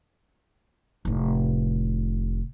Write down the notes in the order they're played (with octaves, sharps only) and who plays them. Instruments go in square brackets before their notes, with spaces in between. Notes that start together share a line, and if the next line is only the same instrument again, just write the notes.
[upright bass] F1 A2